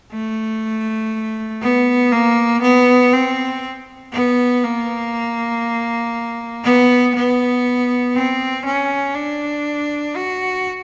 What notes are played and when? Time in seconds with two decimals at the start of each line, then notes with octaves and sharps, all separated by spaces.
0.12 A3
1.62 B3
2.12 A#3
2.62 B3
3.13 C4
4.13 B3
4.64 A#3
6.64 B3
7.15 B3
8.15 C4
8.65 C#4
9.15 D4
10.16 F#4